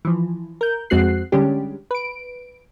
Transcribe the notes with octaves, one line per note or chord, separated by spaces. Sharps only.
E3 F3
A#4 G6
F2 G#3 C4 F#4 F#6 C7
D3 G3 G#3 C#4 D4 G4
B4 D7